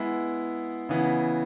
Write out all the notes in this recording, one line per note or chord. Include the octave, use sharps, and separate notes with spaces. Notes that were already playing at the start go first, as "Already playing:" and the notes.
Already playing: G#3 B3 E4
C#3 E3 B3